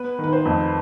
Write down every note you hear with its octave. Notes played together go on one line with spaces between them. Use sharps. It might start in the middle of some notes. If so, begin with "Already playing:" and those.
Already playing: B3 B4
D#3 B4
C5
F2